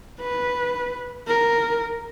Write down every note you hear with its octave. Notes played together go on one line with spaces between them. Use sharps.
B4
A#4